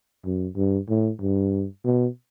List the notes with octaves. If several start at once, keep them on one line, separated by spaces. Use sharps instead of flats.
F#2
G2
A2
G2
B2